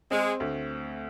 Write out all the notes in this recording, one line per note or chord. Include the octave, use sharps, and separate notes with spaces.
G#3 C4
D2